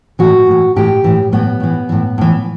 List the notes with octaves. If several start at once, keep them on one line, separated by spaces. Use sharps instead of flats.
A2 E3 F#4
A2 E3
A2 E3 G4
A2 E3
A2 E3 B3
A2 E3
A2 E3
A2 E3